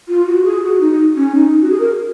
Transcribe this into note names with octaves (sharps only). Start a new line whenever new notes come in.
F4
F#4
G#4
F#4
D#4
C#4
D#4
F#4
G#4
A#4